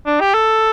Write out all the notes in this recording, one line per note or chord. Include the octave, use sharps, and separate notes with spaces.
D4
G4
A4